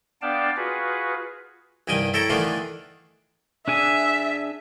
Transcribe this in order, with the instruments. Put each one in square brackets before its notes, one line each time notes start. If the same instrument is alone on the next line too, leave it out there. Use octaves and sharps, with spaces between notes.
[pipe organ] B3 D4 D5 F5 G5 A5
F4 F#4 G#4 B4
[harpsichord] C2 G2 D#3 G5 G#5
E4 A4 C#5 G5 A#5
D#3 E3 A3 B3 D4 F4
[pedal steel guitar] D4 G#4 G#5 [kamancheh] E5